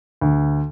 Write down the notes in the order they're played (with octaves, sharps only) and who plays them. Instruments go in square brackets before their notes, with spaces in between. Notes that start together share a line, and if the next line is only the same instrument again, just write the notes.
[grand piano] D2